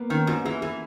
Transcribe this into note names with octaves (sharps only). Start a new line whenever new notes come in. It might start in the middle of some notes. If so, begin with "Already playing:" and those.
Already playing: A#3 B3
D#3 C#4
G#2 F#4
E3 G#4
E3 G#4